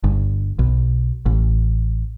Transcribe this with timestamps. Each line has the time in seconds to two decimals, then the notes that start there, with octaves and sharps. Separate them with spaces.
0.04 G1
0.59 B1
1.26 A1